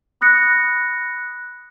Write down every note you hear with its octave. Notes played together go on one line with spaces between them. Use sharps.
B5 D#6 F#6 A#6 C#7